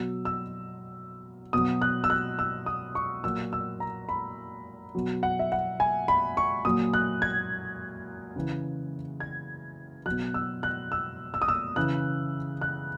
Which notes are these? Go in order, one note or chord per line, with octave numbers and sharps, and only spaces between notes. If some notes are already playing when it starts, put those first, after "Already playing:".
Already playing: B2 F#3 E6
E6
B2 F#3 D#6
F#6
E6
F#6
E6
D#6
C#6
A#2 F#3 E6
E6
A#5
B5
B2 F#3
F#5
E5
F#5
G#5
B5
C#6
A#2 F#3 D#6
F#6
G#6
C#3 E3
G#6
F#3 F#6
B2
E6
F#6
E6
E6
D#6
E6
C#3 E3 F#6
F#6